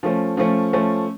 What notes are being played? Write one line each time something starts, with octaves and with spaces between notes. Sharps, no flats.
F3 A3 C#4
F3 A3 C#4
F3 A3 C#4